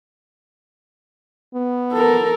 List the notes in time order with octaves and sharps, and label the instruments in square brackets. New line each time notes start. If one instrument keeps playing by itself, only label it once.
[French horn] B3
[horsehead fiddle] A4 A#4